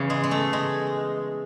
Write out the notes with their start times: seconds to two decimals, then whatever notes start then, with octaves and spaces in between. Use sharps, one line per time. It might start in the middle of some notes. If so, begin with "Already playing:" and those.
Already playing: E2 C#3 E3
0.10 G#3
0.23 G#3
0.31 A3
0.53 G#3